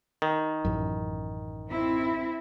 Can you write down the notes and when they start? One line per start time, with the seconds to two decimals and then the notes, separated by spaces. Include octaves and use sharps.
0.22 D#3
0.65 A1 F#2
1.70 C4 E4